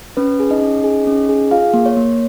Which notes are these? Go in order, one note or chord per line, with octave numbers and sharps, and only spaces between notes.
C#4 B4
G#4
D#4 D#5
C#4
G#4
C#4
G#4
F4 G#4 F5
A#3
C#5
A#3